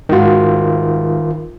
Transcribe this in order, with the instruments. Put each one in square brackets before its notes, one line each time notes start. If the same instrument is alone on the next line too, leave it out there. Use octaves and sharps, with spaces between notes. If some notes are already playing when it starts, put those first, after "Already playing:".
[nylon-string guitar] G#2 F#4 [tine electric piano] D#3 F4